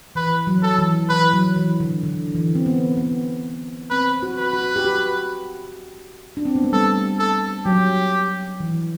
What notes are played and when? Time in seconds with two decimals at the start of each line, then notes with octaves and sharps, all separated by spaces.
0.15 E3 B4
0.47 F#3
0.63 A4
0.79 E3
1.09 E3 B4
1.33 F#3
1.56 E3
1.80 D3
2.03 D3
2.35 E3
2.55 C4
2.66 B3
2.97 B3
3.90 C4 B4
4.23 F#4
4.38 B4
4.53 F#4
4.76 G4
4.85 F#4
6.37 D4
6.45 C4
6.55 B3
6.64 A3
6.72 G3 A4
7.19 A4
7.66 F#3 G4
8.60 E3